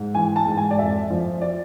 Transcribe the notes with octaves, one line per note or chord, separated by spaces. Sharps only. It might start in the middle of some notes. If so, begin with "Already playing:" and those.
Already playing: G#2
E3 G#5
A5
G#2
G#5
D5
F2 E5
F3
D5